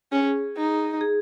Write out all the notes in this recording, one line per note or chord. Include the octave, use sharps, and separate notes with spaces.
C#4 G#4
D#4
G#4